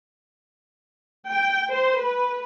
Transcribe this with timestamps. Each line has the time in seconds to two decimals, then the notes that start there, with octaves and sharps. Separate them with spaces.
1.29 G5
1.70 C5
1.99 B4